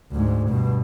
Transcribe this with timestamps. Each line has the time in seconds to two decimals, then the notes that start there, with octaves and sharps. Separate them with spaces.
0.12 D2 G#2
0.49 G2 B2